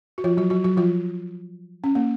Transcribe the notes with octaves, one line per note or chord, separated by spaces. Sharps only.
F#4
F3 F4
F#3 F#4
F#3 F#4
F#3 F#4
F3 F4
C#4
A#3